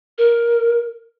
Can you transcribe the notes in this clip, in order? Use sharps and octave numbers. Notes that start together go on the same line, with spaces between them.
A#4